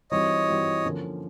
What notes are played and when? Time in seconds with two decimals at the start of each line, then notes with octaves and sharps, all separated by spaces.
0.11 E3 G3 C4 D#4 F#4 C#5 D#5
0.48 E3 G3 C4 D#4 F#4
0.84 D3 F3 A#3 C#4